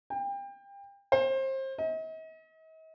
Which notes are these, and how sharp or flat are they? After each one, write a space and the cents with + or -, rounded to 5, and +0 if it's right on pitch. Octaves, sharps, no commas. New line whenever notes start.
G5 +30
C5 +30
D#5 +45